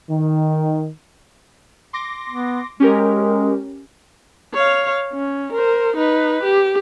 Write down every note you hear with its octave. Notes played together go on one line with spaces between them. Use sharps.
D#3
C6 D6 A#6
B3
G#3 C#4 G4 A#4
C#5 F5
C#4
A#4 C5
D#4 B4
G4